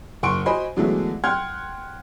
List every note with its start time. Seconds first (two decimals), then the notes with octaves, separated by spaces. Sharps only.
0.23 F#1 F#5 C6 C#6 D7
0.46 F#4 C5 D#5 G#5 B5 C6
0.76 D3 E3 F#3 G#3 A3 B3
1.24 F#5 G5 C6 F6 G#6